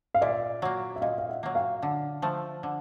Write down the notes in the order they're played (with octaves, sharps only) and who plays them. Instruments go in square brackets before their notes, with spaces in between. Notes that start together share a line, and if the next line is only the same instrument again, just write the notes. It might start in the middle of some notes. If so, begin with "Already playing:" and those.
[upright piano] F5
[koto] A#2 [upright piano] D5 E5
[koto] F#3 A#3
[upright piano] E5
[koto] A#2 [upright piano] D#5 F5
[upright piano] F5
E5 F#5
[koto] F#3 A#3
[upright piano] F5 G5
[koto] D3
F3 A3
D3